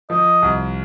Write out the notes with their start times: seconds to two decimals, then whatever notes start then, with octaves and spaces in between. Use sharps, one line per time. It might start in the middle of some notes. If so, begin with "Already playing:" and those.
0.10 F3 D#5
0.42 C2